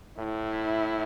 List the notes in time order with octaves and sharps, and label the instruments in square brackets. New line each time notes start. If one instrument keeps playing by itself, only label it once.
[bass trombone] A2 [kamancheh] E4